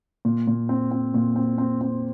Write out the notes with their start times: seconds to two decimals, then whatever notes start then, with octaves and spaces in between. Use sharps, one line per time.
0.25 A#2
0.47 A#2
0.69 C4
0.91 C4
1.14 A#2
1.36 C4
1.58 C4
1.81 C4